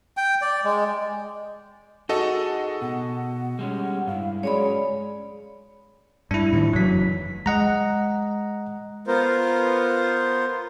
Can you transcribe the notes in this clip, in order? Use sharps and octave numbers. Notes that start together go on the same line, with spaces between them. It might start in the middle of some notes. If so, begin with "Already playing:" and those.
G5
D5
G#3
D#4 F#4 G#4 A4 D#5 F#5
B2 F#5
G3 G#3 C#4
G2 E4 F5
F#3 G#3 C#4 G#4 C#5 D5 B5
G2 D4 E4
A2 D#3 F3
F1 F#2 E3 F#3 B6
G#3 D#5 F#5 A#5
B3 F4 A#4 C5